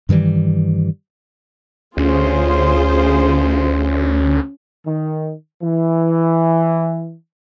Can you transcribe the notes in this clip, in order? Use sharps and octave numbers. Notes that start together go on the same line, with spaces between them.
G2 D#3 E3 G3
D2 C#4 F4 G#4 C5
D#3
E3